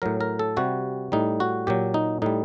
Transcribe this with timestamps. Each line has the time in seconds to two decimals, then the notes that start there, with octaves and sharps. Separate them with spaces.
0.02 A2 F#3 A#4
0.21 A#4
0.39 A4
0.57 C3 G3 F#4
1.12 A2 G3 D#4
1.40 F#4
1.67 A#2 F#3 G4
1.94 D#4
2.22 A2 G3 D#4